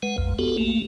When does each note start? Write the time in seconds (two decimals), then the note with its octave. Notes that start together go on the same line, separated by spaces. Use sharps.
0.03 G#3 B4 F#5
0.18 A#1 F2
0.39 B3 F#4 G4 A4
0.57 A3 A#3